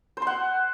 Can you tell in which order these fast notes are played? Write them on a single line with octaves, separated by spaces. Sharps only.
C5 C6 F#5